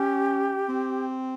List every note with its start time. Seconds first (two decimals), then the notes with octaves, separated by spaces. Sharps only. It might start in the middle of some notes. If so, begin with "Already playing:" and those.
Already playing: C#4 G4
0.69 C4